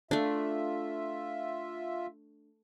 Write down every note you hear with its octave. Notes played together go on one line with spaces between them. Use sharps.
A3 D4 F4 E5